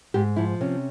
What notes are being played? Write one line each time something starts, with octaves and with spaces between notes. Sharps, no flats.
G#2 G4
F3 E4
C3 C#4